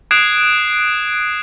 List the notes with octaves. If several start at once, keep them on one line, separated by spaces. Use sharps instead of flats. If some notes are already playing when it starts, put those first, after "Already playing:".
D#6 F#6 G#6 C7 D7 E7